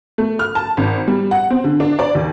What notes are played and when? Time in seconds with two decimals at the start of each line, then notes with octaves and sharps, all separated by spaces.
0.18 A3
0.39 F6
0.55 A5
0.77 G#1
1.08 G3
1.31 F#5
1.50 C4
1.64 D3
1.80 D4
1.99 D5
2.15 D#2